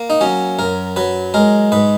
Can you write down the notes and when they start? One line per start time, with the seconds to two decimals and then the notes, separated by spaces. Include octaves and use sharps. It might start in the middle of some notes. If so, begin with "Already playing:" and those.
Already playing: A#3
0.10 D#4
0.21 F#3 C#4
0.59 F#2 A#4
0.96 F#3 B4
1.34 G#3 A#4
1.72 G#2 B4